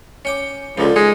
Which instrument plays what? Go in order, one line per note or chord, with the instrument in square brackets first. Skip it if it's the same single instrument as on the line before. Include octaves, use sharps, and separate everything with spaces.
[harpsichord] C#4 G5 D6
[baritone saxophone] C#2 [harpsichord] D3 F3
[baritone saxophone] G#3 [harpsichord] D#4